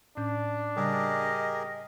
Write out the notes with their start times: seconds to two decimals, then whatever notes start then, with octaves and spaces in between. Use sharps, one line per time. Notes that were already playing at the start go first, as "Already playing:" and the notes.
0.17 A2 C#4 D4 G6
0.76 C#3 G3 G4 G#4 A#4 D#5